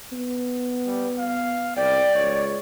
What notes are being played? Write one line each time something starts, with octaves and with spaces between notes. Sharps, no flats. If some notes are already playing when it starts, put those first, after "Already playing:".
B3
G3
F5
C2 D5 G5
C#2 C#5